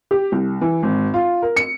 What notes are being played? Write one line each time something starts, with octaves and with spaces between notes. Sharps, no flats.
G4
C2
E3
G#1
F4
A#4
C#7